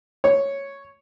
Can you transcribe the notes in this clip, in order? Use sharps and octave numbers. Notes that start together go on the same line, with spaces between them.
C#5